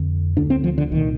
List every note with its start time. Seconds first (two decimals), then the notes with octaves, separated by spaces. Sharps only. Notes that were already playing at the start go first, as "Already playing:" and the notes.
Already playing: F2 D3
0.37 D2 D3 D4
0.50 C4
0.64 F3
0.78 D3
0.91 C2 A#2 D#3